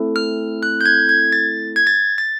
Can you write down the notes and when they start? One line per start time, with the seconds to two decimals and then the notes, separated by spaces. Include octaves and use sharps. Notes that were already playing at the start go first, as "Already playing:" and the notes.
Already playing: A3 C4 E4 A4
0.16 F6
0.63 F#6
0.81 G6
0.86 G#6
1.09 G#6
1.32 A6
1.76 G#6
1.87 A6
2.18 A6